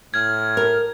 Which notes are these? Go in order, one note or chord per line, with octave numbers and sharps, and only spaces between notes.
A2 F6 G#6
A#4